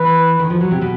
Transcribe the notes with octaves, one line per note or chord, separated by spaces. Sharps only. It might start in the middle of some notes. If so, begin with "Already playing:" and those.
Already playing: E3 B4
D#3
F3
F#3
C3
B2